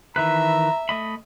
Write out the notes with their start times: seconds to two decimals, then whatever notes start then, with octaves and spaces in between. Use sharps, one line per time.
0.16 D#3 E3 B4 E5 A#5
0.89 A3 D#5 B5